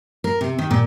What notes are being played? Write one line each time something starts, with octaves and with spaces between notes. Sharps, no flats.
A#4
C3
D#3
A#2